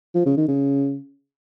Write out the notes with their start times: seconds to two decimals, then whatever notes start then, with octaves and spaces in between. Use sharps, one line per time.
0.15 F3
0.26 C#3
0.37 D#3
0.48 C#3